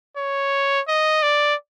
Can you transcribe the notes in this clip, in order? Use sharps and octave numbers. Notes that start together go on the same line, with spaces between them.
C#5
D#5
D5